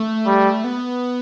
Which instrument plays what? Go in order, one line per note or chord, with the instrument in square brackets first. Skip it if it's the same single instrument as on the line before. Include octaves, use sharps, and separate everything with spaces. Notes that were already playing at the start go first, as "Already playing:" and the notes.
Already playing: [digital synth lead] A3
[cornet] G3
[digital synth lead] B3